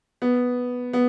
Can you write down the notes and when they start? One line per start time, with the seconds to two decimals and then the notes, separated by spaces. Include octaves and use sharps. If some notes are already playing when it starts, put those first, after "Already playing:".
0.22 B3
0.93 B3